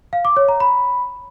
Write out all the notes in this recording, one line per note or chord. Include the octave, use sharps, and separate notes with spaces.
F5
D6
C#5
A#5
B5